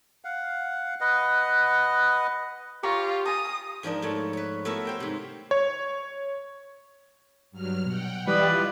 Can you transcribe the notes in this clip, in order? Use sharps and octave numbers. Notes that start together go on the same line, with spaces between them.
F5 F#5
B4 D#5 F#5
F4 G4 C#5 A#5 C#6
G#5 A#5 D#6
G#2 F3 D4 A#4
G#2 A3 A4 C#5
B4 C#5
A3 B3 E4 F#4 A#4 E5
C5 G5 A#5
G#2 C3
C#5
G2 F#3 F6
B2 F#5 G5
E3 G3 E4 F4 B4 D5 D#5